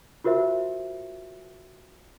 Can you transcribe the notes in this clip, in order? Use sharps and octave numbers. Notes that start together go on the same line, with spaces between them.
F4 F#4 A#4 C5 E5